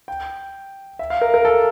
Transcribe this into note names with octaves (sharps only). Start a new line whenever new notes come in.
G5
E5
F5
A#4
A#4
A4